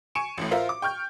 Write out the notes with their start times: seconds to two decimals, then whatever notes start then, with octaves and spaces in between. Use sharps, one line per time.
0.15 G#5 C#6 C#7 D7 E7
0.38 A1 A2
0.51 F4 A#4 C5 E5 F5
0.69 D6
0.82 G5 C#6 F6 G6